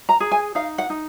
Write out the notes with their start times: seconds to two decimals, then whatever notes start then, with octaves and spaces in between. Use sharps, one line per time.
0.09 A#5
0.20 G#4
0.31 G#5
0.55 D#4 F5
0.78 F#5
0.90 D#4